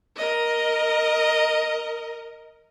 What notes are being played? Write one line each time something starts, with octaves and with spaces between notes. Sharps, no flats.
A#4 D#5